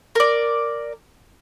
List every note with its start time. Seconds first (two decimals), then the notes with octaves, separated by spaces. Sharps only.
0.15 A#4 D5